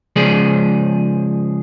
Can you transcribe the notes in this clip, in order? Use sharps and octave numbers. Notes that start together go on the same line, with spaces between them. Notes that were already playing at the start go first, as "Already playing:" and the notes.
C#3 F3 G#3 G#4 D5